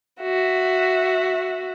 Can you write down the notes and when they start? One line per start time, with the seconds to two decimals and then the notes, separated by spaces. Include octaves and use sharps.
0.22 F#4 E5